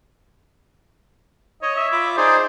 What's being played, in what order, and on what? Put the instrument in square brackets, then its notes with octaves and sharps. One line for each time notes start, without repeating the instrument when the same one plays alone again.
[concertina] C#5 [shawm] D#5
[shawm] E5
[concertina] F4 B5 D6
[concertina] D#4 G#4 D5 [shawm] C5